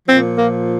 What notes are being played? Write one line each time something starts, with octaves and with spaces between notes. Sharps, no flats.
A#2 F3 C4
A#3